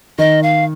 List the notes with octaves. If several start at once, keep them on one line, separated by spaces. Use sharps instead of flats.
D#3 D#5
F5